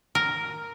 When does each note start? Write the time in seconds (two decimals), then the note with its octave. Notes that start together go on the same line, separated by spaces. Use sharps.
0.15 A#4